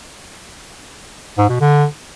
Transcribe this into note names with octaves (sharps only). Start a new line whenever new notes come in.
G#2
B2
D3